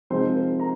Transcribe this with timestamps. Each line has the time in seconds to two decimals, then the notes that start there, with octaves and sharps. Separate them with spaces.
0.10 C3 F3 G#3 C4 D#4 C5
0.35 A#4
0.60 A#5